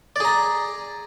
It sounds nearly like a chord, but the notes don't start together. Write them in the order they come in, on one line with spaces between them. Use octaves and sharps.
D5 G#4 A#5